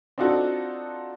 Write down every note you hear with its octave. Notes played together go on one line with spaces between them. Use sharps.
C4 D4 D#4 F4 F#4 A4